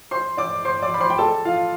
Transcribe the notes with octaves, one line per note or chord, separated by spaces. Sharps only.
C5 C6
D5 D6
C5 C6
D5 D6
B5
C5 C6
G5
A4 A5
F4 F5